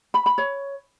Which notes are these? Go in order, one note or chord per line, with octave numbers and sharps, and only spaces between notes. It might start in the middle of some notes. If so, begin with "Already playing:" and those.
B5
B5
C#5